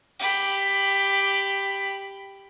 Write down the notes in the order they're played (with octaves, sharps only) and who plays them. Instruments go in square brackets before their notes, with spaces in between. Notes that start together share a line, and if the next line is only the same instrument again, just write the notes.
[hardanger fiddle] G4 B5